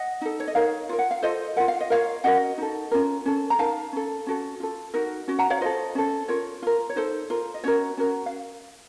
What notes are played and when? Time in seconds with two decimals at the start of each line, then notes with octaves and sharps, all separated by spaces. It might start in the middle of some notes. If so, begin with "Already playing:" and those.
Already playing: D#5 F#5
0.21 D#4 A4
0.40 C#5
0.48 D#5
0.55 D#4 A#4 C#5 F5
0.89 F4 A#4
0.99 F#5
1.11 F5
1.23 F4 A4 C5 D#5
1.56 F4 A#4 F#5
1.68 F5
1.81 D#5
1.90 F4 A#4 C#5 F5
2.24 C#4 F#4 A#4 D#5 F#5
2.58 D#4 A4
2.91 C#4 F4 A#4
3.26 C#4 A4
3.50 A#5
3.58 D#4 A#4 F5 A5
3.93 C#4 A4
4.27 C#4 F#4 A4
4.60 F4 A4
4.94 D#4 F#4 A#4
5.28 C#4 F#4
5.39 F#5 A#5
5.50 C#5 F5
5.61 F4 A4 C5 D#5
5.95 C#4 A4
6.28 F4 A#4 C#5
6.63 F4 A#4
6.90 C#5
6.96 D#4 A4 C5
7.30 F4 A#4
7.54 D#5
7.64 C#4 F#4 A#4 C#5
7.97 C#4 F#4 A#4
8.26 F5